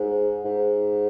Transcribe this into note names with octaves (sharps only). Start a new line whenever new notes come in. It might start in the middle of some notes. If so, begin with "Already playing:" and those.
Already playing: G#2
G#2